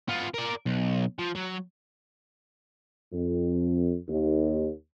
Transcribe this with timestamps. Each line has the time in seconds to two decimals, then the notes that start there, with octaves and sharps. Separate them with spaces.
0.09 B3 F4
0.34 A#4 D5
0.66 B1
1.19 F3
1.35 F#3
3.12 F2
4.08 D#2